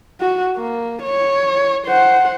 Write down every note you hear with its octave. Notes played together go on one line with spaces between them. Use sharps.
F#4
A#3
C#5
C5 F#5